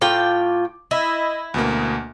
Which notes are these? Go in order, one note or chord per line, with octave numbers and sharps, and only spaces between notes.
A2 F4 G5 D6
E4 D#5 B5
D2 B2 A#3